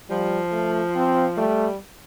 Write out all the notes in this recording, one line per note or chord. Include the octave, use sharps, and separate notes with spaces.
F3 G3
A3
C4
G3 A3